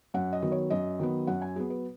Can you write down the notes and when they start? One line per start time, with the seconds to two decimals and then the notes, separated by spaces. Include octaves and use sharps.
0.14 F#2 F#5
0.33 D#5
0.42 D#3 F#3 B3
0.52 C#5
0.70 F#2 D#5
0.99 D#3 F#3 B3
1.27 F#2 F#5
1.42 G#5
1.56 F#3 B3 G#4
1.70 B4